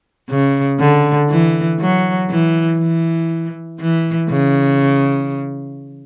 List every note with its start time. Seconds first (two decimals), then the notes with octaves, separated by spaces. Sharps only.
0.29 C#3
0.80 D3
1.29 E3
1.80 F#3
2.30 E3
2.79 E3
3.80 E3
4.30 C#3